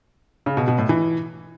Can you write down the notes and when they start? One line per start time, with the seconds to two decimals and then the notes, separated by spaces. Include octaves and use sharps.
0.46 C#3
0.57 B2
0.68 B2
0.78 A2
0.89 E3